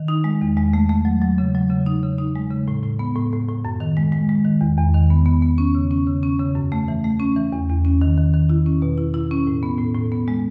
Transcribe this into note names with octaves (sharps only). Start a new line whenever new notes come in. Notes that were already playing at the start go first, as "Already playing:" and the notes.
Already playing: D#3
D#4
G#3
E2
G#3
A3
A3
F#3
F#3
C#3
F#3
C#3
D#4
C#3
D#4
G#3
C#3
A2
A2
B3
A2
A2
A2
F#2
D#3
G#3
G#3
G#3
D#3
E2
E2
D#3
B3
B3
B3
C#4
C#3
C#4
C#3
C#4
C#3
F#2
A3
E3
A3
C#4
E3
E2
E2
C#4
D#3
D#3
D#3
E4
C#4
B2
E4
E4
C#4
A2
B3
A2
A2
B3
G#3